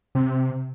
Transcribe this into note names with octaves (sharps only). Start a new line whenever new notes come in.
C3